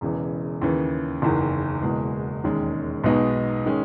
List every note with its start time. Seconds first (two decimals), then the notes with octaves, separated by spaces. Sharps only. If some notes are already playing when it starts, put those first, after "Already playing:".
0.01 E1 E2 C#3 E3
0.62 D#2 C#3 E3
1.22 F#1 E2 D#3
1.82 F#1 E2 B2 G#3
2.44 E1 D#2 D#3 G#3 C#4
3.04 B1 B2 G#3 B3 D#4
3.66 D#3 G#3 C#4